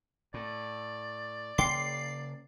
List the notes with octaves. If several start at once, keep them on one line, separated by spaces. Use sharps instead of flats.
A2 D5
C#3 A#3 G5 C6 D6 C7